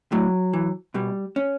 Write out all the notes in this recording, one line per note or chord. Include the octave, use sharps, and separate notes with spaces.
A2 F#3
E3
B2 G3
C#4